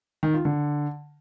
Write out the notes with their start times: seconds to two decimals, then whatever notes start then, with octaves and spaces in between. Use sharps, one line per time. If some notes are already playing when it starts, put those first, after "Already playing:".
0.23 D#3
0.34 F4
0.45 D3